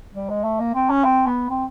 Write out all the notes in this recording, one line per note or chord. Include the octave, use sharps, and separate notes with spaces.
G3
G#3
A3
A#3
C4
C#4
C4
B3
C4